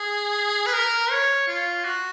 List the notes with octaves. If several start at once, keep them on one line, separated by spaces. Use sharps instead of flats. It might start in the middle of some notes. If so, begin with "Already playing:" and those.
Already playing: G#4
B4
A#4
C#5
F4
F#4